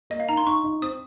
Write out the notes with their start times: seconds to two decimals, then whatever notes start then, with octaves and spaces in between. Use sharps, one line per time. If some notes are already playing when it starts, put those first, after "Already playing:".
0.10 A#3 D#5
0.20 F5
0.29 D#4 A#5
0.37 C6
0.46 D#4 C#6
0.64 D#4
0.82 C4 D#6